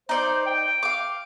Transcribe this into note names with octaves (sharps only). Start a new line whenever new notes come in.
D#4 C5 D5
G5
F5 D6